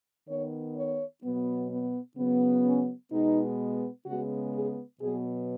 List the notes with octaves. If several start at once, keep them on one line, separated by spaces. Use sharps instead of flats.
D#3 B3 C#5
C#5
B2 F#3 B3
B3
C#3 F#3 B3
C#4
B2 G#3 B3 D#4
C#3 G#3 B3 F#4
G#4
B2 F#3 B3 G#4